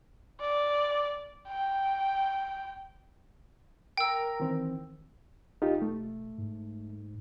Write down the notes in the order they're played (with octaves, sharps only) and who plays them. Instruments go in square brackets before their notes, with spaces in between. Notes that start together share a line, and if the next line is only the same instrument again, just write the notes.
[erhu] D5
G5
[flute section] A#4 [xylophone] G5 E6
[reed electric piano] D#3 E3 C4
[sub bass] E1 [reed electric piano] D#4 F4 G4
[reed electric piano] A3
[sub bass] G#2